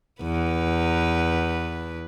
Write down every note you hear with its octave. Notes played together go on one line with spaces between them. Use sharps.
E2 B4